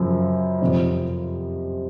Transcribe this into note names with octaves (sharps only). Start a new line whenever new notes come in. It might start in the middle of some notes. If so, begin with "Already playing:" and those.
Already playing: F#2 C#3 F3
F2 C3 F3